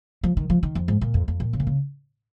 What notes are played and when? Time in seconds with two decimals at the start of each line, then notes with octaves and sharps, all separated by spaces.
0.23 F3
0.37 D#3
0.50 F3
0.63 D#3
0.75 F2
0.88 G#2
1.01 A#2
1.14 F2
1.28 F2
1.40 A#2
1.53 C#3
1.60 A#2
1.67 C#3